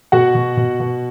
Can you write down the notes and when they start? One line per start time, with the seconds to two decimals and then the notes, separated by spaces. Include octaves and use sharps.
0.12 B2 F#4 F#5
0.35 B2
0.57 B2
0.80 B2